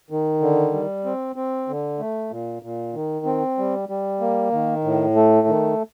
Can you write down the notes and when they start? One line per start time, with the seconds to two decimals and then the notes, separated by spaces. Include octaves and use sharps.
0.10 D#3
0.41 D3
0.73 G3
1.05 C4
1.36 C4
1.68 D3
1.99 A3
2.31 A#2
2.62 A#2
2.94 D#3
3.26 C4
3.58 G3
3.89 G3
4.21 A#3
4.52 D#3
4.84 A2
5.15 A3
5.47 D#3